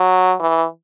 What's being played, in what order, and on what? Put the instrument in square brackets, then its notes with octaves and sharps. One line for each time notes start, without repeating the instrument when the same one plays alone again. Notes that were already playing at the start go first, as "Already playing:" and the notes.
Already playing: [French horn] F#3
E3